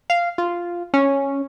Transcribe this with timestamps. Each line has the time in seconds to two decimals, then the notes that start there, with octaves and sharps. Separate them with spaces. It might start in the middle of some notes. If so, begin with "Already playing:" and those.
0.10 F5
0.38 F4
0.94 C#4